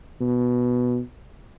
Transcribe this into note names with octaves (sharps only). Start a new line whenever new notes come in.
B2